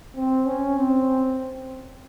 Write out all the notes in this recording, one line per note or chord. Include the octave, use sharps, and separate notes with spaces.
C4
C#4
C4